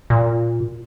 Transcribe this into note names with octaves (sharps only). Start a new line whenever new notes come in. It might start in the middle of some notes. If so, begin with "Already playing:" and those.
A#2